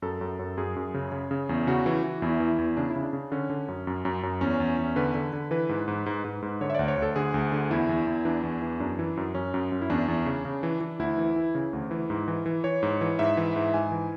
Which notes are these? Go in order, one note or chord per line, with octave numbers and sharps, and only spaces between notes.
F#2 A4
F#2
F#2
F#2 G#4
F#2
C#3
C#3
C#3
E2
C#3 F#4
E3
E3
E2 E4
E3
E2
C#3 D4
E4
C#3
D4
C#3
D3 C#4
D3
F#2
F#2
F#2
F#2
E2 C#4
E2
E2
D3 B4
D3
D3
E3 B4
G#2
G#2
G#2
G#2
G#2
D3 C#5
E5
D2 D5
C#5
D2 A4
D3 G#4
D2
D3
E2 E4
E2
E2
E3 D4
E2
E3
F#2 D4
E3
F#2
F#2 C#4
F#2
F#2
E4
E2 D4
E2
C#3
C#3
E3
E3
D2 E4
E3
E3
C#3
D2
E3
G#2
E3
E3
E3 C#5
G#2
E3
G#2 E5
E3
G#2
G#2 G#5
E3